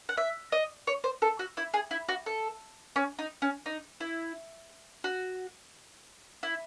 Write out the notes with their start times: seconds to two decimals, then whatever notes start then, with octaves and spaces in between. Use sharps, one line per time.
0.09 F#5
0.17 E5
0.52 D#5
0.87 C#5
1.04 C5
1.22 A4
1.39 F#4
1.57 E4
1.74 G#4
1.91 E4
2.09 F#4
2.26 A4
2.96 C#4
3.19 D#4
3.42 C#4
3.66 D#4
4.00 E4
5.04 F#4
6.43 E4